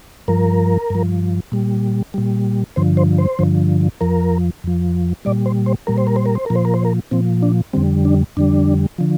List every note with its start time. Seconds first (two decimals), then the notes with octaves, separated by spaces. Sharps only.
0.28 G2 F3 A#4
0.90 G2 F3
1.52 A#2 G3
2.14 A#2 G3
2.76 G2 D3 F3 C5
2.97 C5
3.18 C5
3.39 G2 D3 F3
4.01 F2 F3 A#4
4.64 F2 F3
5.25 A#2 G3 D5
5.46 C5
5.66 C5
5.87 A#2 G3 A#4
5.98 C5
6.07 A#4
6.16 C5
6.26 A#4
6.35 C5
6.46 A#2 F3 A#4
6.55 C5
6.65 A#4
6.74 C5
6.85 A#4
7.11 A#2 F3 C4
7.43 D4
7.73 F2 D3 G3 C4
8.05 D4
8.37 F2 D3 G3 D4
8.98 D3 F3